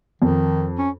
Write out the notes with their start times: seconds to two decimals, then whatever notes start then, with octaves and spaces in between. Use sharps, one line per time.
0.22 F2 D#3
0.78 C#4